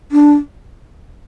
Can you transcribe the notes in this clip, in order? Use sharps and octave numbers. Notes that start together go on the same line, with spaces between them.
D4